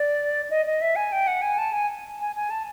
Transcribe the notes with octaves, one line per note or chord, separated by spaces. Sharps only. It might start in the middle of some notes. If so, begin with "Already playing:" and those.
Already playing: D5
D#5
D#5
E5
G#5
G5
F#5
G#5
A5
G#5
G#5
G#5
A5